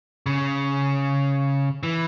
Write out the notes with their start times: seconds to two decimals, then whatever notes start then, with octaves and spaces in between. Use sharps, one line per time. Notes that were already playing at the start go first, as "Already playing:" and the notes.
0.26 C#3
1.83 E3